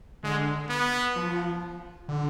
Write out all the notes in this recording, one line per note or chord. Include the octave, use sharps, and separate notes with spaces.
D3 G#3
B3
F3
D3